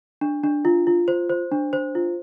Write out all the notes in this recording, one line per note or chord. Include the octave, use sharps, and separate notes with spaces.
D4
D4
F4
F4
C5
C5
D4
C5
F4